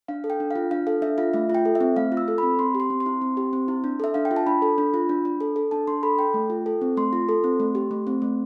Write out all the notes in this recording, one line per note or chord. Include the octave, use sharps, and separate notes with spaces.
D4 F5
A4
G5
D4
F4 F5
D4 F5
A4 F5
D4 E5
F4 F5
A3 E5
F4
G5
A4
E5
C4
A3 F5
F4
E6
A4
C4 B5
C4 C6
G4
C6
C4
C6
E4
C4
G4
C4
E4
D4
A4 E5
D4 F5
G5
F4
A5
D4 B5
A4
D4
F4
D4
D4
A4
A4
D4 A5
D4 C6
A4 B5
A4 G5
A3
F4
A4
C4
A3 C6
F4
A4
C4
A3
G4
A3
C4
A3